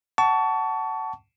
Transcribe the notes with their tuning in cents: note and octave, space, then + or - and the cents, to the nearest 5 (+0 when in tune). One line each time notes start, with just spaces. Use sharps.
F#5 +25 A5 +0 C#6 +30